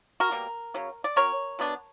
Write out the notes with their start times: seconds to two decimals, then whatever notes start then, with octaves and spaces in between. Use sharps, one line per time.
0.20 F#4 A#4
0.31 B2 G3 A#3
0.74 C#3 F#3 C#4
1.04 D5
1.16 F#3 C#4 A#4 C#5
1.59 B2 F#3 B3 D4